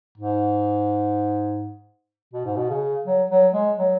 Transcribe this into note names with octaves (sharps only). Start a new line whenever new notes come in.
G#2
B2
G#2
B2
C#3
F#3
F#3
G#3
F#3